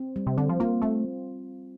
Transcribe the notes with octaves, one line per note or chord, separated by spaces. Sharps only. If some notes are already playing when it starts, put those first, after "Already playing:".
Already playing: C4
G3
C3
D3 C4
F3
A#3 F4
A3 C4